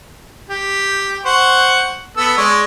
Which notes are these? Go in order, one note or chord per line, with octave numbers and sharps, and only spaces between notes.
G4
C5 F#5 C#6
B3 A4 E6
G#3 C#5 D5